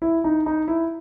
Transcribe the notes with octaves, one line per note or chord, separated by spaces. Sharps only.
E4
D#4
D#4
E4